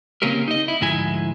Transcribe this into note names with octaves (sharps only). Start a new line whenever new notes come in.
C#3 A#3 C4 C#4 G4 A#4
D#4 D#5
E4
D2 G#2 F3 G#3 E4 G#5